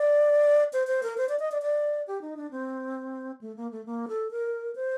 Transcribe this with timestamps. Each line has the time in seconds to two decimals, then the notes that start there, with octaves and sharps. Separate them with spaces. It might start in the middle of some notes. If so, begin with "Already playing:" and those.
Already playing: D5
0.73 C5
0.87 C5
1.03 A#4
1.18 C5
1.29 D5
1.39 D#5
1.52 D5
1.62 D5
2.08 G4
2.21 D#4
2.37 D4
2.51 C4
3.41 A3
3.57 A#3
3.71 A3
3.86 A#3
4.08 A4
4.31 A#4
4.76 C5